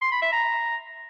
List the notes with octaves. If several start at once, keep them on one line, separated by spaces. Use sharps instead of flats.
C6
B5
E5
A#5